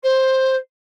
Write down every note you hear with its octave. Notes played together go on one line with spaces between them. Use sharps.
C5